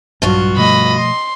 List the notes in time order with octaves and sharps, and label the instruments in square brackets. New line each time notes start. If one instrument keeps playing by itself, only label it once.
[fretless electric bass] A#1 F#3 [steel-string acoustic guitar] G2 F4 F#4
[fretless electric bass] B2 F3 A3 [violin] D#5 B5
[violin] C6